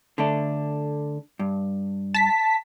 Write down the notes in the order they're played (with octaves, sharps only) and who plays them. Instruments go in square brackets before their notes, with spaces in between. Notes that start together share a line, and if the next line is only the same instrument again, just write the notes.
[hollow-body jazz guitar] D3 A3 D4
G2
[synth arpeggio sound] A5 B6